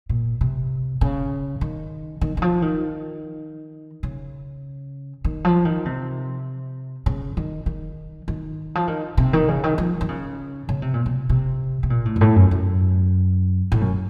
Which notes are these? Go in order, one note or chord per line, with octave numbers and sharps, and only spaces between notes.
A#2
C3
C#3
D#3
D#3
D#3
F3
D#3
C#3
D#3
F3
D#3
C3
C#3
D#3
D#3
D#3
F3
D#3
C3
D#3
C#3
D#3
F3
D#3
C#3
C#3
C3
A#2
C3
C3
C3
A#2
A2
F#2
A2
F#2
F#2
A2
F#2